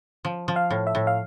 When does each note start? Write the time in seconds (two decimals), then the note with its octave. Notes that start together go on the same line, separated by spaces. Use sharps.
0.25 F3
0.48 F3
0.56 F5
0.71 A2
0.87 E5
0.95 A2
1.07 F5